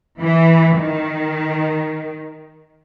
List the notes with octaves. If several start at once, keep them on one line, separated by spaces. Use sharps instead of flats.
E3
D#3